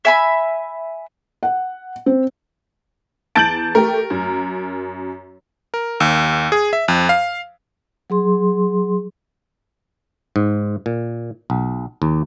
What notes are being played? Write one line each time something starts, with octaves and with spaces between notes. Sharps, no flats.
E5 G#5 B5
F#5
C4
E2 A5 G6 A6 D7 F#7
A3 G4 A#4
F#2
A#4
D#2
G#4
E5
F2
F5
F#3 G#4 C6
G#2
A#2
B1
D#2